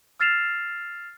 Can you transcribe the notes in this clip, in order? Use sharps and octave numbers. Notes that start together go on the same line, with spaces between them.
E6 F6 A6 C7 E7 F7